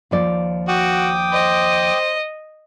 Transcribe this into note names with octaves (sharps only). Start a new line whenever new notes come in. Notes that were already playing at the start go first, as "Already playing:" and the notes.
D#2 F3 D5
F#4 G5 D6 D#6
C5 D#5